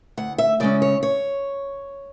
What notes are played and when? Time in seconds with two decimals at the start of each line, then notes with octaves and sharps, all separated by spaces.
0.17 D2 F#5
0.38 E5
0.60 C#3 G#3 C#4 D5
0.82 C#5
1.03 C#5